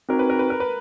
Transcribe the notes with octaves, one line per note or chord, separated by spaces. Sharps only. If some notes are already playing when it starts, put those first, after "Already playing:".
C4 D#4 F#4 A#4
B4
A#4
B4
A#4
B4